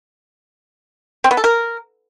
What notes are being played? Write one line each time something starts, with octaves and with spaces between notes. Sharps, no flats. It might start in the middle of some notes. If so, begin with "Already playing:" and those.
C4
B3
A4
A#4